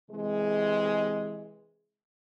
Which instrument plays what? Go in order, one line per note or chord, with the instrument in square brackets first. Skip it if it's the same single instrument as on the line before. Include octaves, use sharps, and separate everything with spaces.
[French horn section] C3 E3 G#3